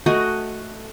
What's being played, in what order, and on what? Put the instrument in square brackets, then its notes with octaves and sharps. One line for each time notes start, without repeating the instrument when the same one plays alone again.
[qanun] A3 F#4 D#5 G#5